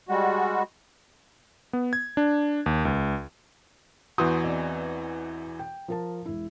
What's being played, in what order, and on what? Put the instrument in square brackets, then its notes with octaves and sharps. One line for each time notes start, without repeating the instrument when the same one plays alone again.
[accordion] G3 G#3 F#4
[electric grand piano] B3
G#6
D4
D#2
C#2
[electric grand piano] E2 E3 F#4 [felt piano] C6 D#6 G6
[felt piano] C4 D5 D#5
G5
F3 A#4 A5
E1 E4